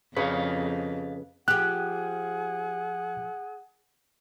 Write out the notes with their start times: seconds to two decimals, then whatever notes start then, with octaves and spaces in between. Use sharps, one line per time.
0.17 F2 C#3 B4 D#5 F5
1.48 F3 G4 G#4 F#5 F#6